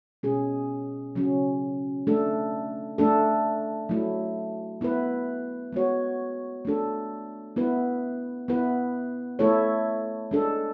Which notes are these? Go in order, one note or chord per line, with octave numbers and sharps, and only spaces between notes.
B2 G#3 C#4 G#4
C#3 F#3 C#4
A3 D4 A4
A3 D4 A4
F#3 A3 E4
B3 E4 B4
G#3 B3 F#4 C#5
A3 D4 A4
B3 E4 B4
B3 E4 B4
A3 E4 A4 C#5
G#3 D4 A4